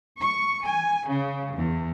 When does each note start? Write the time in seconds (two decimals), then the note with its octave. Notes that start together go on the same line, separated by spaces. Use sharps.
0.19 C#6
0.64 G#5
1.07 C#3
1.54 E2